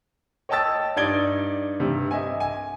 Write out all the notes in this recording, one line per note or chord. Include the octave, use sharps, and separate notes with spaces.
C#5 D#5 G5 A5 E6 A6
G2 D#4 D5 G#6 D7 G7
G2 C3
D#5 E5 G#5
G#5